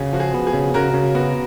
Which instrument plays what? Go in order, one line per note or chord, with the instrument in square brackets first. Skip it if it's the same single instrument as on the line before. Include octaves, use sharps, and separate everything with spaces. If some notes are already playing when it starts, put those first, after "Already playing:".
Already playing: [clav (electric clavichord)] C#3 [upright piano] F#4 G#4
[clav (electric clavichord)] F3 [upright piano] F#4
[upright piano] G#4
[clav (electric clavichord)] B3
[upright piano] G#4
[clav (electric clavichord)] C#3
[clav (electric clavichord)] C#3 [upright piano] F#4 A#4
[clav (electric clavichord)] C#3
[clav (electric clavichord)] B3 [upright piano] F#4